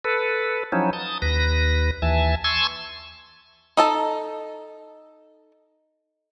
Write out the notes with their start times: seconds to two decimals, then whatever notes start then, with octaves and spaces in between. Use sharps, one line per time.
0.05 A4 B4
0.72 F3 F#3 C#4 D#4 E4
0.93 A5 D#6
1.22 D#2 B4 A#6
2.02 D#2 E3 E5 G#5 A5
2.44 G#5 A5 C6 C#6 E6 G#6
3.77 D#4 A4 A5